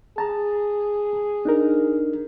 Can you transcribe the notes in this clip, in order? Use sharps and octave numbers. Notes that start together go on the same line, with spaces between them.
G#4 A5 A#5
D4 D#4 A#4